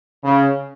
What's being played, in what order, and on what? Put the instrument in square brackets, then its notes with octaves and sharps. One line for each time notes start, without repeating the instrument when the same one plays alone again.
[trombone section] C#3